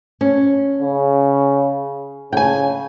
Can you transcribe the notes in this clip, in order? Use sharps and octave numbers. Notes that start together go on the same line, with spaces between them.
C#4
C#3
C#3 G5 G#5